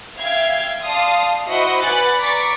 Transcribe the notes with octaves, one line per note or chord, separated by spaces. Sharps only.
E5 F5 G5 G#6
D5 F5 A5 C6 D#6
E4 F#4 C5 D#5 E5 F#5
B4 D5 F#5 G#5 F#6 A6
D5 A#5 C#6 D6 A6 B6